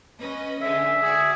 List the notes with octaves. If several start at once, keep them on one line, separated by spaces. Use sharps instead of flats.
C#4 B4 D#5
D3 G#3 E5
F#4 G#4 D5